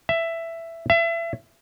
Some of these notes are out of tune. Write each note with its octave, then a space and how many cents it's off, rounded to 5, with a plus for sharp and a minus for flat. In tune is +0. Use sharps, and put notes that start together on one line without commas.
E5 +10
E5 +30